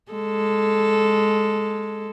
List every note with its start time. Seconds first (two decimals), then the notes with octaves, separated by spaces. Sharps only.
0.12 G#3 A4